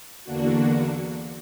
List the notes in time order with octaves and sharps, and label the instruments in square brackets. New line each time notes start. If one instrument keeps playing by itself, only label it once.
[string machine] E2 D3 A#3 D4 F#4